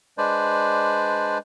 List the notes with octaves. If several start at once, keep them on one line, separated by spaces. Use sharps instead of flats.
G#3 D4 B4 C5 D5